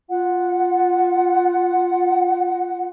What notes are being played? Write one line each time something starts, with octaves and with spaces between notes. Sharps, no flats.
F4 F#5